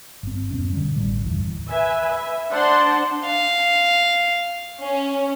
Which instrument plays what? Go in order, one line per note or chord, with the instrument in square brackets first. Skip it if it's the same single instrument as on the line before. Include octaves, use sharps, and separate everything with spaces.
[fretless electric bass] G1 C4
D1 F#2 B2 C#4
D3 G3
A1 A2 G3
F#1 D#2 E3
[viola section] B4 E5 G#5
E5
D4 C5 F#5 A5 C6
[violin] F5
[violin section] C#4